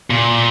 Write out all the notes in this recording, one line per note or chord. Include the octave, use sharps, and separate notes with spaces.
A#2